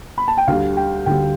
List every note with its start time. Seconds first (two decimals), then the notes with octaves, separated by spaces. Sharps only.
0.18 B5
0.28 A5
0.38 G5
0.47 D2 D3 G3 F5
0.77 G5
1.06 D2 D3 G3 G5